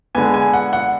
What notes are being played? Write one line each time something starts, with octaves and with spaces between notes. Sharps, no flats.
D3 G#3 B3 G#5
G#5
F#5
F#5